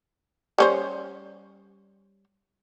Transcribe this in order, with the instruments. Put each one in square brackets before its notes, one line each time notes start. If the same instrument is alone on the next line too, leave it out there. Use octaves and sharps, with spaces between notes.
[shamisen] G3 C#4 C5